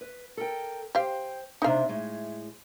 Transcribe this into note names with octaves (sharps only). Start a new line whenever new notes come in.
B4
A4 A#4 G5
G4 C5 F5 G5
C3 D4 D#4 F5
A2 G#3